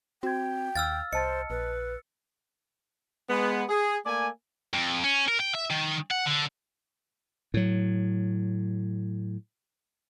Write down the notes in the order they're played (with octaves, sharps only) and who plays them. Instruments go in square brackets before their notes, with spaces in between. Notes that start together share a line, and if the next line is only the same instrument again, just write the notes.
[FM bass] C4 [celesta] F#4 G#6 [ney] G5
[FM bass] D#2 [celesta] F5 [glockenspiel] E6 F6 A6
[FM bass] C2 [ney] C5 [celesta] D#5 A5 A6 [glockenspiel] C#7
[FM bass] A#1 [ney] B4
[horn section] G#3 B3
G#4
A3 A#3 D5 G#5
[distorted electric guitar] F2
C#4
A#4
G5
E5
D#3
F#5
D3
[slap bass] A2 F#3